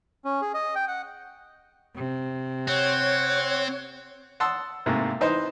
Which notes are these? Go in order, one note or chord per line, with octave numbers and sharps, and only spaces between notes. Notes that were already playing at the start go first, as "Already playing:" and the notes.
C#4
G#4
D#5
G5
F#5
C3
C4 C#5 F#5
F#5 A5 C6 D#6 E6
G#2 C3 A3 A#3
E3 D#4 C5 D#5